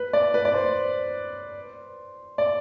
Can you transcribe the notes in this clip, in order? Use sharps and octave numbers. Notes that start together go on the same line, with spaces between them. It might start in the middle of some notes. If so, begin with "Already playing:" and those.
Already playing: B4
D5
B4
D5
C5
D5